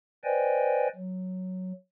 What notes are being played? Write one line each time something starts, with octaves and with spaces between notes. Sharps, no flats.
B4 C5 D5 D#5 G5 G#5
F#3